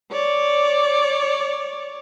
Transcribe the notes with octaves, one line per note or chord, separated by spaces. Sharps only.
C#5 D5